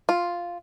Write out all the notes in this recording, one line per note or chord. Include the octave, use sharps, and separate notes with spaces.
F4